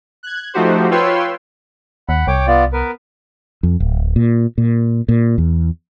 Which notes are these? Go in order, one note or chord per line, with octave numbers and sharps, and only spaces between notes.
F#6 G#6
F3 A3 D#4 F#4 G4 C5
F4 B4 C#5 G5 C6 E6
D#2 F#5 B5
C2 C#5 G5 D6
B3 F4 D5
B3 A#4 B4
F2
D1
A#2
A#2
A#2
E2